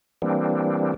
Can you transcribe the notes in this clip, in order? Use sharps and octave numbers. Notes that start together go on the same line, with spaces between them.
E3 G3 A#3 C4 D4